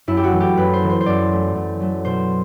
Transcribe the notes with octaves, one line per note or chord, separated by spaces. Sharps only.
F#2 E4
G4
F#4
E3 A3
G4
F#2 B4
C5
E3 A3
C5
C5
F#2 D5
F#3 A3
F#2
F#3 A3
B2 C5